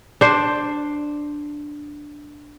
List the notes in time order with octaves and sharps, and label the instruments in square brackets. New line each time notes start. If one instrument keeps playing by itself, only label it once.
[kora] D4 C5